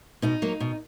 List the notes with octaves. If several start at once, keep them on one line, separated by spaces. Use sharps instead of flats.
B2 D#4
F#3 A#3
B2